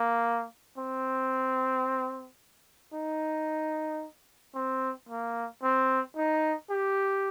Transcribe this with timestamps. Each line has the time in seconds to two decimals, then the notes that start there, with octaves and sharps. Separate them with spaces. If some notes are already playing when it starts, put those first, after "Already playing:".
Already playing: A#3
0.78 C4
2.94 D#4
4.55 C4
5.09 A#3
5.63 C4
6.17 D#4
6.70 G4